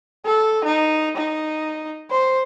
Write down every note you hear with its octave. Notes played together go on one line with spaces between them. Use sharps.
A4
D#4
D#4
C5